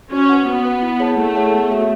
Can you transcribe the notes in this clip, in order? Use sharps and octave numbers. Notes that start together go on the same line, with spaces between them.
C#4 F#4
B4 F#5
B3 F#4
B4 F#5
E4
G#4 C#5 F#5 A5
A3 E4
G#4 C#5 F#5 A5
B3
F#4 A4 C#5 E5